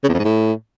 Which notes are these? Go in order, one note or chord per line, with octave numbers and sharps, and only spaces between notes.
C#3
E2
F2
G#2
A2